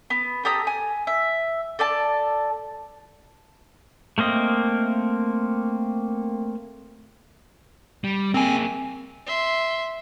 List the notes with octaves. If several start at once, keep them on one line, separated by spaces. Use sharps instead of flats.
B3
G4 A4 A#5 D#6
G#5
E5
A4 D5 A5
A3 A#3 C4 D#5
G3
A#3 C4 G#4 G#5
E5 C6